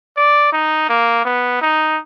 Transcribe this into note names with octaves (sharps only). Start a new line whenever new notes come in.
D5
D#4
A#3
B3
D#4